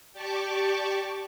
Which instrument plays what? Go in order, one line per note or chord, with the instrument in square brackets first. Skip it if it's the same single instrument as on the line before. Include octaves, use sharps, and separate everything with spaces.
[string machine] G4 D5 A5 C#6 D6